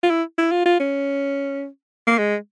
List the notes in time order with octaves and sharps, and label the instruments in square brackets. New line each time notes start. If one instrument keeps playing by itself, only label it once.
[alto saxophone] F4
E4
E4
F4
F4
C#4
A#3
G#3